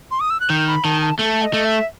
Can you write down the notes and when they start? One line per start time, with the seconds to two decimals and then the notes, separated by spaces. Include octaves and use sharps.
0.11 C6
0.20 D#6
0.30 E6
0.40 F#6
0.50 D#3 G6
0.68 B5
0.84 D#3 A5
1.02 A5
1.19 A3 A5
1.42 D#5
1.53 A3
1.65 E5